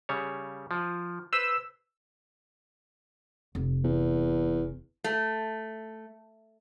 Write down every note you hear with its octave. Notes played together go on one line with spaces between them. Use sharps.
C#3 G3 C#5
F3
B4 C5 E6
F1
E2
A3